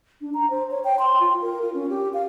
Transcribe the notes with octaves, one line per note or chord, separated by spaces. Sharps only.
D4
A#5
C5
C#5
G5
C6
F4
A#4
F4
C#4
G4
F5